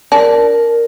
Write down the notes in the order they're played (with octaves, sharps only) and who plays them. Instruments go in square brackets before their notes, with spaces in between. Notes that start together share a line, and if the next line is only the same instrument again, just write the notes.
[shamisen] D4 [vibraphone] A#4